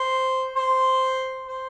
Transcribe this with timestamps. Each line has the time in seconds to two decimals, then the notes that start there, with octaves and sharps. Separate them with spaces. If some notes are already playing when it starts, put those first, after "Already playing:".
Already playing: C5
0.56 C5
1.47 C5